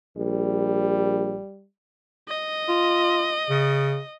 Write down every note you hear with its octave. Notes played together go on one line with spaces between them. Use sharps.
A#1 G3
D#5
F4
C#3